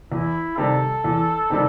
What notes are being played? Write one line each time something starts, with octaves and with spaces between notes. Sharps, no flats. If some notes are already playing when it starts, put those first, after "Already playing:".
E2 E4
C3 D#3 G3 A4
E2
C3 D#3 G3